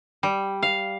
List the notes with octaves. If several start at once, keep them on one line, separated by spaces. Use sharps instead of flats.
G3
F5